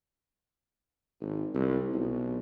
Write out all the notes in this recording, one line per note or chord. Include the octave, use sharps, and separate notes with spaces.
G#1
C2
B1